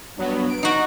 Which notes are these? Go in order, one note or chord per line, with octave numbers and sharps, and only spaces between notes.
G2 F#3 B3
D7
D#4 F#4